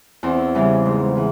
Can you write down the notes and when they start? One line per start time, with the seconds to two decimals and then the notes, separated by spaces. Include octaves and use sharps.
0.23 E2 C4
0.55 C#3 E3 G3
0.86 G#2
1.17 E3